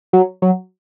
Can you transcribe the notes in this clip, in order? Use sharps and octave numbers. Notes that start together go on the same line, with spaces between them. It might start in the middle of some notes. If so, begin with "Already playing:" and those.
F#3
F#3